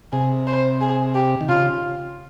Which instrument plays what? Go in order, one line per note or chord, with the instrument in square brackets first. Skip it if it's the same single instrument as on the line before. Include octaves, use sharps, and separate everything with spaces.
[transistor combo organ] C3 [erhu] G#4
[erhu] C5
G#4
G4
[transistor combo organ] D#3
[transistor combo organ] C#3 [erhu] F4